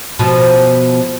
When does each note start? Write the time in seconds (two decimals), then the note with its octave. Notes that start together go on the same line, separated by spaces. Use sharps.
0.19 B2 F3